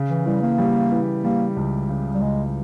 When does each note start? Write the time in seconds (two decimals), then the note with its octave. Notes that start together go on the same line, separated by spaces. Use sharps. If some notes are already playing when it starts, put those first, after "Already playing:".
Already playing: C#3
0.10 E3
0.26 E3 G3
0.42 A#3
0.58 G3
0.92 E3
1.24 G3 A#3
1.57 C#2
1.89 C#3
2.14 G3
2.21 C#2 G#3